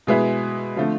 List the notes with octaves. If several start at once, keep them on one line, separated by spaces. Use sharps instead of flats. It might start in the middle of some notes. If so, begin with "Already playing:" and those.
B2 G#3 B3 E4
D3 F3 A3 C4